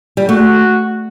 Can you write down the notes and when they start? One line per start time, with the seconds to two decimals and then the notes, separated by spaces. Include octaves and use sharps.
0.17 G3
0.28 A3 F#4